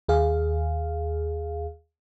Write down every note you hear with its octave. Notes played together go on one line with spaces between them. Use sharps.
D#2 G#4 F5